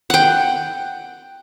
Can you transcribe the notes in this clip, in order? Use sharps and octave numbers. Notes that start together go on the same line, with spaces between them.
F#5 G5